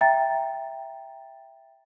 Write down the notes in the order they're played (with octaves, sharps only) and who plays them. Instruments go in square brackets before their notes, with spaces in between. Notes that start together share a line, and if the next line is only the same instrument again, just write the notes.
[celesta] E5 G5 A#5 A6